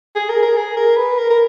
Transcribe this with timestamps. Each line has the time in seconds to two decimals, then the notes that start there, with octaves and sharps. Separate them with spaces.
0.15 G#4
0.29 A#4
0.42 A#4
0.56 G#4
0.77 A#4
0.97 B4
1.18 A#4
1.30 A#4